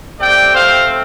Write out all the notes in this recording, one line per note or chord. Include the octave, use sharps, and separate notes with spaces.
A3 C4 G4 D5 G5
C5 F5